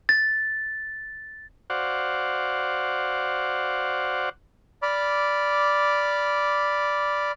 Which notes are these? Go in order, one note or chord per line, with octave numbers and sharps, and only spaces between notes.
A6
F#4 C5 D5 F5 F#5
D5 B5 D6 F6